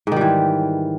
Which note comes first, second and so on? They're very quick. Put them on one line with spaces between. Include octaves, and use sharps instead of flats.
G#2 D#3 G3 E3